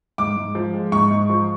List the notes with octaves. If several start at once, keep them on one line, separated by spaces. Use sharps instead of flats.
G#2 D6
G#2
F3
G#3
G#2 C#6
G#2
F3